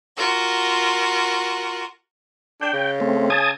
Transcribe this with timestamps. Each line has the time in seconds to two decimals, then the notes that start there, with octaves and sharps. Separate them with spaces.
0.16 F4 F#4 A#4
2.61 D4 G5
2.73 C#3
3.00 A3 C4
3.30 G#5 A5 D#6